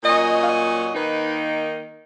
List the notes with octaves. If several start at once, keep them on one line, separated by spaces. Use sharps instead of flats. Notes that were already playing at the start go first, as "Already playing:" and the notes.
A#2 F#3 C#4 D#5
F5
D#5
D#3 A#3 D#4 B4